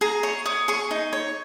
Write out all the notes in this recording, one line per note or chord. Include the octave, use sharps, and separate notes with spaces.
G#4 A#5
C#5 C#6
C#5 D#6
G#4 C#6
D#4
C#5